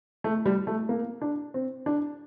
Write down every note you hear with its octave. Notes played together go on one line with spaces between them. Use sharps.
A3
G3
A3
A#3
D4
C4
D4